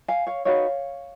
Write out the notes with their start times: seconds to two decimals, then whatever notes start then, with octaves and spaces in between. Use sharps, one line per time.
0.08 F5 G#5
0.27 C#5 F5
0.45 D#4 F#4 B4 C#5 F5